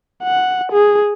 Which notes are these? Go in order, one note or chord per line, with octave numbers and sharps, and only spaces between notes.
F#5
G#4